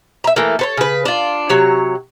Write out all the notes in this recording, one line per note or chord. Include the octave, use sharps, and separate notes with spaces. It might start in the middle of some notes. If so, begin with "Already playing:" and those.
E5 A#5
E3 A3 A#3
A4 B4 C#5
C#3 B4
D4 F4
C3 F#3 C#5